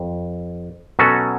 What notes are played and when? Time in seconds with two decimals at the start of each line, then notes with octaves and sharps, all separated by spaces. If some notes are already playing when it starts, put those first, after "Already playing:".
Already playing: F2
0.99 B2 F#3 C#4 F#4 A4